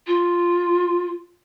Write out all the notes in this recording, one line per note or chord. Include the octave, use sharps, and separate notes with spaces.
F4